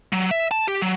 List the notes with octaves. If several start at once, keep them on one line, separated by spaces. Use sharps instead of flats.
F#3
E5
A5
G4
F#3